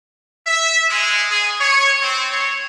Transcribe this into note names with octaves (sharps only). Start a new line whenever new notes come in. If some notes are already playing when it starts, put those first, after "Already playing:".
E5
G#3
G#4
C#5
C4
C#5